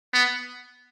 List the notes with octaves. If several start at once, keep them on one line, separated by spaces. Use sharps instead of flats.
B3